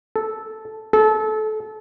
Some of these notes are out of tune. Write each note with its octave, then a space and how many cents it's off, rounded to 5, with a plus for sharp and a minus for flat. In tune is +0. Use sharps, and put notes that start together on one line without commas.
A4 -5
A4 -25